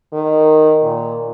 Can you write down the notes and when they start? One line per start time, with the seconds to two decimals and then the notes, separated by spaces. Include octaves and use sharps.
0.13 D#3
0.84 A#2